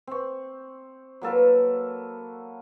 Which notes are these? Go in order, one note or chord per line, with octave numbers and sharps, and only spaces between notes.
C4 C#6
F#3 A#3 A4 B4